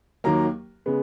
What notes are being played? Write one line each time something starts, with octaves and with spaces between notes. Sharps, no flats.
D#2 D#3 F#3 A#3 A#5
C#3 G#3 B3